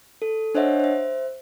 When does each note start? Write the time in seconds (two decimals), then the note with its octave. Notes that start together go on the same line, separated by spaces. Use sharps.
0.22 A4
0.55 D4 C5 C#5 D#5 E5 F#5
0.80 C5 E5